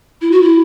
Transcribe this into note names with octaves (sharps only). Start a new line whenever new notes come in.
E4
F#4
E4